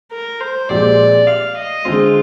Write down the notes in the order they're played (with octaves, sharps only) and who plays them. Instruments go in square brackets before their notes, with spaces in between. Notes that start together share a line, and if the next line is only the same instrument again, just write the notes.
[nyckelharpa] A#4
C5
[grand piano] A#2 F3 G#3 C4 G4 [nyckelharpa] D5
[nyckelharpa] F5
D#5
[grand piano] D3 G#3 C4 [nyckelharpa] F4